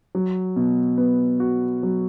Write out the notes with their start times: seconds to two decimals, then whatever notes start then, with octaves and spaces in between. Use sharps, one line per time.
0.15 F#3
0.56 B2
0.98 B3
1.40 F#4
1.83 F#3